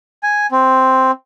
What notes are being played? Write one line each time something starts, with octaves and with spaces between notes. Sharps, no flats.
G#5
C4